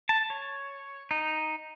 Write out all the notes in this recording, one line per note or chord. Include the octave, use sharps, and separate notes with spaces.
A5
C#5
D#4